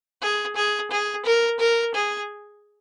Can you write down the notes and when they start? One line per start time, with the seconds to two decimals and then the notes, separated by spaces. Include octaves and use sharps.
0.21 G#4
0.55 G#4
0.90 G#4
1.25 A#4
1.59 A#4
1.94 G#4